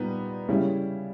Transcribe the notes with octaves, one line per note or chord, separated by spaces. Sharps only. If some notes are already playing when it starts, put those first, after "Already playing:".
Already playing: A#2 G3 B3 D#4
C#3 G3 C#4 E4